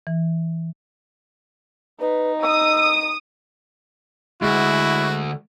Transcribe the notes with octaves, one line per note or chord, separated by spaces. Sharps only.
E3
D#4 B4
D#6 E6
D2 G#3 E4 F#4